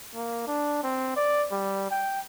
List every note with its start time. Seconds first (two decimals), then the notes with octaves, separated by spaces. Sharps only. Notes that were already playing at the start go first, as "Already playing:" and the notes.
0.15 A#3
0.47 D4
0.83 C4
1.16 D5
1.51 G3
1.91 G5